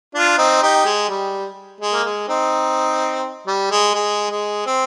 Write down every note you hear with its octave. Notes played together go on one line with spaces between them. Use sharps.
D4 F4
C4 D#4
D#4 G4
G#3
G3
G#3
A#3
G#3
C4 D#4
G3
G#3
G#3
G#3
C4